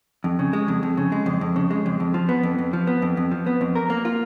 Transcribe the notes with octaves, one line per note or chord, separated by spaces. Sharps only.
F2
C#3
G#3
F2
F2
C#3
G#3
F2
F2
C#3
G#3
F2
F2
F3
B3
F2
F2
F3
B3
F2
F2
F3
B3
F2
A#4
A#3
F4